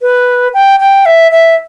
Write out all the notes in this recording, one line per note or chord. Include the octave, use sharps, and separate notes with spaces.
B4
G5
G5
E5
E5